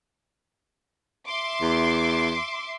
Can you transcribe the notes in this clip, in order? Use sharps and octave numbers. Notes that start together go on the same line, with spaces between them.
E5 C6 D6
E2